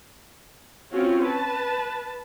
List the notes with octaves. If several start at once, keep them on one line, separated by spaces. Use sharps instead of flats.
C4 C#4 F4 F#4
B4 A5